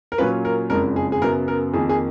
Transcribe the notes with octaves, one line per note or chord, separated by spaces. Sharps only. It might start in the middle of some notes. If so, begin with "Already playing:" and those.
A#4
A#2 F#3 C#4 F4 B4
A#4
F#1 F2 C#3 G#3 A#4
G#4
G#4
F#2 C#3 F#3 B3 A#4
A#4
F2 D#3 A#3 G#4
G#4